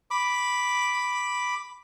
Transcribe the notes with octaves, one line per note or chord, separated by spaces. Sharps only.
B5 D6